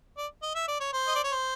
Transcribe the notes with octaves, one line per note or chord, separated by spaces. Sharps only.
D5
D#5
E5
D5
C#5
C5
D#5
D5
C#5
C5